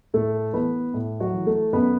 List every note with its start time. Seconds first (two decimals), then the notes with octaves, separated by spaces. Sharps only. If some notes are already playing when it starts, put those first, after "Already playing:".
0.14 A2 A3 A4
0.54 E3 B3 B4
0.94 A2
1.20 F#3 F#4
1.34 E3
1.47 A3 A4
1.73 F#2 B3 B4